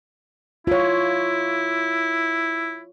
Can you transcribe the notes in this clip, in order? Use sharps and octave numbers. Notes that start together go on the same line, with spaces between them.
E4 F4 C#5